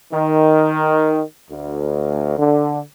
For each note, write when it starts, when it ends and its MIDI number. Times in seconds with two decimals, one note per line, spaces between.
0.12 1.22 51
1.51 2.38 38
2.38 2.79 50